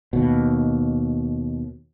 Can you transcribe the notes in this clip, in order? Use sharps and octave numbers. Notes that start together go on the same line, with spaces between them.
D#2 B2